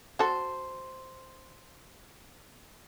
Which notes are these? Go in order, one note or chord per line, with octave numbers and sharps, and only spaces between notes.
F#4 A4 C5